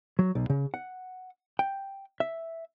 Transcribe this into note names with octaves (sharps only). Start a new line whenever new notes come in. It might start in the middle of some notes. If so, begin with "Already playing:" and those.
F#3
B1
C#3
F#5
G5
E5